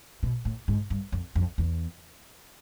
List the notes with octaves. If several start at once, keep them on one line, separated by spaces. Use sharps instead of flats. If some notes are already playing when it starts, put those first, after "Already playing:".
B2
A2
G#2
G2
F2
F2
E2